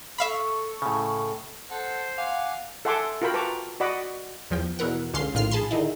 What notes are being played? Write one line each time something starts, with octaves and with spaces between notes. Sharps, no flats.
A4 E5 F5 B5 C#6
A2 C#3
A4 C5 F#5
F5 F#5 G#5 D6
A4 E5 F#5 G#5 C6 D6
F4 F#4 A#4 G5 B5
B4 A5 A#5 C#6 D6
F#4 D5 D#5 F#5 B5 D6
E2 F3 G5
E2 B2 E4 A#4 F#5
C#2 D3 C#4 F5 C6 C7
A#1 A2 D#3 F4 F6 C7
G#4 A5 B5 C6
D3 D#3 D#4 E4